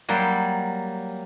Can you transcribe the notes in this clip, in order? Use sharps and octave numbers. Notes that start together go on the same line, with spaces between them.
F#3 G3 A#3